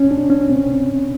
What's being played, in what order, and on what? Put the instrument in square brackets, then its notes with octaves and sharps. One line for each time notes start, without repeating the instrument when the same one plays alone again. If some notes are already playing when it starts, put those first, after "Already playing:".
Already playing: [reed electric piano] C#4
D4
C#4
C4